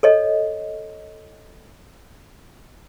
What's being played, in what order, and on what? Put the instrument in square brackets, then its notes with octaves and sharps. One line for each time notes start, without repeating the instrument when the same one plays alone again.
[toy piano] A4 C#5 D#5